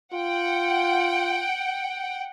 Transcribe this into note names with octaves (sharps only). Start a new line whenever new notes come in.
F4 F#5 G5